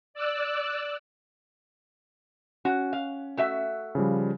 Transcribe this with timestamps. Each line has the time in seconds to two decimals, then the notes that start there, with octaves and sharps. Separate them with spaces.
0.14 D5 E6 F#6
2.65 C#4 F#4
2.93 F5
3.37 A3 F#4 E5
3.95 C#3 F3 G3